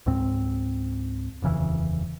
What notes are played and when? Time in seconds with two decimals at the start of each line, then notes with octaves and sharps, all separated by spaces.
0.06 C#2 G#2 C4
1.42 D#1 F2 C#3 E3